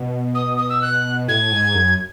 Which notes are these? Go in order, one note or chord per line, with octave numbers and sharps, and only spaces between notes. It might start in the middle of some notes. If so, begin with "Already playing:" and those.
Already playing: B2
D#6
D#6
E6
F#6
A2 G#6
G#2
F#2